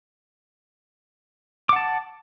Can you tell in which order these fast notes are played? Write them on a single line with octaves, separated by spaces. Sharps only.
D6 F#5 A5